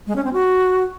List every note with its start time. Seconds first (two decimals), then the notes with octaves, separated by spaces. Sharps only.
0.07 G#3
0.16 C#4
0.24 C4
0.33 F#4